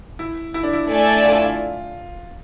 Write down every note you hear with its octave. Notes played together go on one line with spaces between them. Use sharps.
E4
E4
D4
E4
A3 D4 A4 D5 G#5
F4
E4
F4